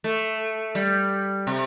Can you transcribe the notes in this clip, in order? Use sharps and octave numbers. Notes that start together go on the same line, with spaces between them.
A3
G3
C3